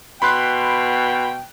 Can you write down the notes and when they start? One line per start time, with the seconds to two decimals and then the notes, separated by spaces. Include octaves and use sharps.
0.22 B2 G5 B5 C6 F#6